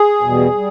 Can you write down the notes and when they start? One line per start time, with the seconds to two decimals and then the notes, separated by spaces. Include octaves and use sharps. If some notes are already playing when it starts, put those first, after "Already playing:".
Already playing: G#4
0.21 E2 B2 G3
0.54 G3